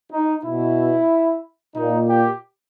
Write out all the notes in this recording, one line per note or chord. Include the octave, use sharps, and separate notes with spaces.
D#4
B2 E4
A#2 D#4
G4